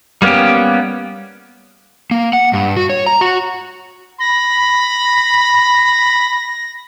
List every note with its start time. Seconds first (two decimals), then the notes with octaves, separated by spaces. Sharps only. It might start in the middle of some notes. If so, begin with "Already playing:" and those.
0.22 G3 A#3 B3 C#4 G4
2.11 A#3
2.33 F#5
2.53 G2
2.77 F#4
2.90 C#5
3.06 A#5
3.21 F#4
4.20 B5 A#6